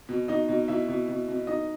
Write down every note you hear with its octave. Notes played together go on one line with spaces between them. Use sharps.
B2
B2 D#4 D#5
B2
B2 E4 E5
B2
B2
B2
B2 D#4 D#5